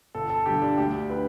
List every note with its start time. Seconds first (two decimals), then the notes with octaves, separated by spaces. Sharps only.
0.15 G1 A4
0.30 A4
0.46 G2 D3 G4
0.62 D4
0.78 D2 G4
1.10 D3 B4